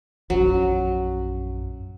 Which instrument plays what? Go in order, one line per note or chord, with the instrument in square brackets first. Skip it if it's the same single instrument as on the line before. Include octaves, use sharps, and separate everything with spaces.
[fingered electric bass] A#1 F#2 C#4 [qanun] F#3